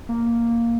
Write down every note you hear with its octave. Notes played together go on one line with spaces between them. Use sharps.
A#3